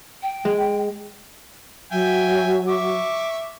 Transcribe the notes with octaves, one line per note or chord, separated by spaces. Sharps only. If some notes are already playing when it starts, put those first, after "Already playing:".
G5
G#3
F#3 E5 G5 G#5
E5 C#6 D6